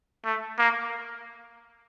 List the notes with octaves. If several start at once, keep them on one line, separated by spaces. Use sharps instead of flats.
A3
A#3